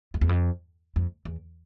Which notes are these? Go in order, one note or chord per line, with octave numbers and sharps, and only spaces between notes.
F2
E2
F2
F2
E2